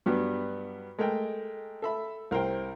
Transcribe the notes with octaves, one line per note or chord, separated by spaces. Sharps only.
G2 F#3 G3 B3
G#3 A3 A#4 G5
A4 E5 B5
C2 A#4 C5 G5